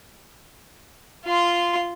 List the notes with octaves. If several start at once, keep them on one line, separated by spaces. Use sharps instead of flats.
F4 C6